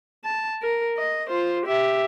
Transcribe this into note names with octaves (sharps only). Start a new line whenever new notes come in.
A5
A#4
D#5
F4 C5
G4 E5